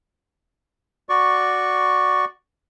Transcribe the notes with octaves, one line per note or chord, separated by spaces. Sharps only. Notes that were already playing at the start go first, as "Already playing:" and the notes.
F#4 D5 C#6